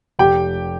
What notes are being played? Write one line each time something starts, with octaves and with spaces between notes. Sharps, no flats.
F1 G4 G5